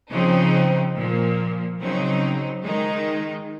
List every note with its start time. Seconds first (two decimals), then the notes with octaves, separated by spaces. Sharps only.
0.11 C#3 F3 C4 D#4
0.96 A#2 F3 A#3
1.80 C#3 F#3 C4 D#4
2.64 D#3 G#3 D#4